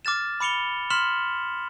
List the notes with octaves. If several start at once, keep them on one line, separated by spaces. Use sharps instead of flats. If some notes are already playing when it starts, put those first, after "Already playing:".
D6 F6 A6 E7
B5 D6 C#7 F7 G7
C6 F6 B6 E7 F#7